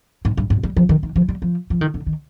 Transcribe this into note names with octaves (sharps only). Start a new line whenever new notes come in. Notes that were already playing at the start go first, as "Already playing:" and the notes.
G#2
G2
G#2
G3
F3
D#3
D#3
F3
G3
F3
F3
D#3
D3
D#3